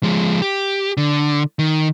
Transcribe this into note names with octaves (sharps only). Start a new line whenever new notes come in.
F3 G#3
G4
D3
D#3